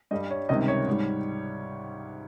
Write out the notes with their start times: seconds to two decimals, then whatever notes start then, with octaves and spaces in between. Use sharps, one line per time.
0.11 G2 G3 D#5
0.30 C#5
0.49 C#2 C3 D#3 G3 D#5
0.68 C#5
0.86 G#2 G3